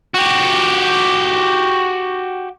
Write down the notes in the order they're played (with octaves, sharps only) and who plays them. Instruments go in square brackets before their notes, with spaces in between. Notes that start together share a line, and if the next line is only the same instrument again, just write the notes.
[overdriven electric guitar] F#4 G4